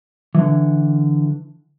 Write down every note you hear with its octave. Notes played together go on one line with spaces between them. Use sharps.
D3 E3